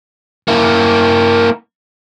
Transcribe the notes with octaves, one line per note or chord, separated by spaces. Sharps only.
A#3 E4